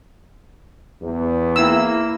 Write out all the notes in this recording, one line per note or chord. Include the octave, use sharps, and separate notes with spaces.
E2
A#3 E4 E6